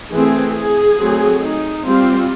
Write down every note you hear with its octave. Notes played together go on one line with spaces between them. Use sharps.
E3 A3 C4 G#4
G#4
F#3 A3 C4
D#4
G3 C4 F4